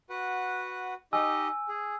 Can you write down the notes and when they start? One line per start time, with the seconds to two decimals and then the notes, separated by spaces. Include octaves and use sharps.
0.10 F#4 B4 F#5
1.13 D#4 G4 D#5 G#5 E6
1.68 G#4